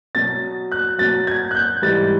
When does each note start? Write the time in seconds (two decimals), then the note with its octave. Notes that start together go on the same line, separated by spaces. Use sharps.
0.15 B2 F#3 A6
0.72 F#6
0.98 B2 F#3 A6
1.27 G#6
1.51 F#6
1.55 G6
1.82 G#2 E3 G3 A6